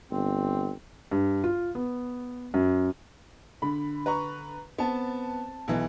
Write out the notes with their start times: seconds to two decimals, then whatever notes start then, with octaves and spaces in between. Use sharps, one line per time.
0.11 G1 C4
1.11 G2
1.44 F4
1.75 B3
2.54 F#2
3.62 D3 B5
4.06 B4 A#5 C#6
4.78 B3 C4 A5
5.68 B1 E3